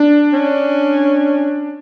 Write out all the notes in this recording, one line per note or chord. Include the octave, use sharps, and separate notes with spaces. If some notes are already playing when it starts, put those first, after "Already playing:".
Already playing: D4
C#4